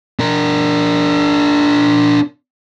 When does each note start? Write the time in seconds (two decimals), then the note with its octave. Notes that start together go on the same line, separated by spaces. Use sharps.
0.20 D4 A#4